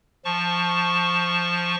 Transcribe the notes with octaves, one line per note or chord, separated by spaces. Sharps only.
F3 A5 C#6